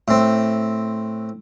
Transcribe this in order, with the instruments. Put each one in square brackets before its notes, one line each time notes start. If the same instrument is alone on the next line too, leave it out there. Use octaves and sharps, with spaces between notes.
[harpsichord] A2 C4